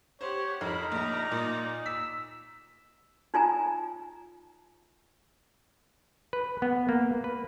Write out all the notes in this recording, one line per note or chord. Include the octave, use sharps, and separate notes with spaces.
G4 C5 C#5 F#5
F2 D#4 E4 A#4 B5
A#1 D5 A#5
A#2
E6 B6
D#4 F4 G#5 A#5
B4
B3
A#3
B4